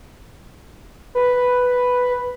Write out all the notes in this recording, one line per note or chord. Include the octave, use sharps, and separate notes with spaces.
B4